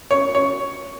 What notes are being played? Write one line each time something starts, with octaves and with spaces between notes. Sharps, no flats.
C#5
C#5